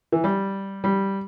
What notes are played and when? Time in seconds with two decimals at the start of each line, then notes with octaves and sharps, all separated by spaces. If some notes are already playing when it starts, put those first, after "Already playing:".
0.12 E3
0.24 G3
0.84 G3